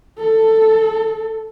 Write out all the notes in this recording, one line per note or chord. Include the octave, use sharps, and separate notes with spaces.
A4